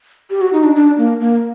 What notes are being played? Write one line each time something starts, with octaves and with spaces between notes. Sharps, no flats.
G4
F#4
D#4
D4
D4
A#3
A#3